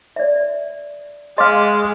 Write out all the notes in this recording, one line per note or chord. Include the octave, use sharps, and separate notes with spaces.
D5 E5
G#3 D#5 F5 C6 D6 F6